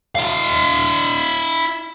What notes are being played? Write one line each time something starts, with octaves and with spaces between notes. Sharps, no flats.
E4 F5